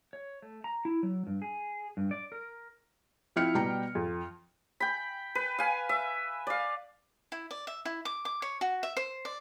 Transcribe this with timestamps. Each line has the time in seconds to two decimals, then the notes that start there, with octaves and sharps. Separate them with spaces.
0.13 C#5
0.42 A3
0.64 A#5
0.85 E4
1.03 F#3
1.27 G2
1.42 G#4
1.97 G2
2.11 D5
2.32 A#4
3.36 F3 C4 E4 F6 C#7
3.55 B2 G3 G5 A#5 C#7
3.95 F2
4.80 G5 B5
5.35 B4
5.59 F5 G#5
5.89 E5
6.47 D5 F5
7.32 E4
7.51 D5
7.67 E5
7.85 E4
8.05 D6
8.25 D6
8.42 C#5
8.61 F#4
8.83 E5
8.97 C5
9.25 D5